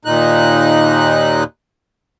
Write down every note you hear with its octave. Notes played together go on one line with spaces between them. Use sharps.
D#2 A#2 D#4 F#6